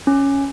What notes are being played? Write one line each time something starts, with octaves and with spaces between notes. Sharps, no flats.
C#4